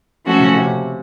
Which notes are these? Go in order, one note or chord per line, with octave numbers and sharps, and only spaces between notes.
F3 A3 C#4 F#4 A4
C#3
C3